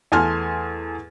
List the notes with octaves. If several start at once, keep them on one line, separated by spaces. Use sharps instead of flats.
E2 A3 A4 G#5 C6 F6